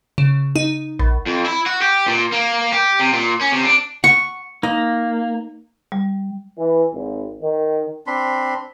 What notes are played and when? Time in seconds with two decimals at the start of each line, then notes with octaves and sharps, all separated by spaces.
0.18 C#3
0.56 D#4
0.99 A#1
1.26 F2
1.46 E4
1.66 F#4
1.82 G4
2.07 A#2
2.32 A#3
2.72 G4
3.00 C3
3.13 A#2
3.41 C#4
3.53 C3
3.64 D4
4.04 F#5 C#6
4.63 A#3 D#4
5.92 G3
6.58 E3
6.93 G#1
7.41 D#3
8.07 C4 D4 B5 C6